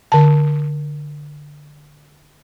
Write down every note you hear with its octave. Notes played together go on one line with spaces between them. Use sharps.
D3 A5